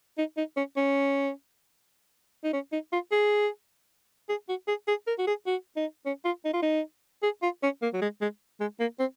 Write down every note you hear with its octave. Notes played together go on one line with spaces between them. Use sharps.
D#4
D#4
C#4
C#4
D#4
C#4
D#4
F4
G#4
G#4
F#4
G#4
G#4
A#4
F#4
G#4
F#4
D#4
C#4
F4
D#4
F4
D#4
G#4
F4
C#4
A#3
F#3
G#3
G#3
G#3
A#3
C4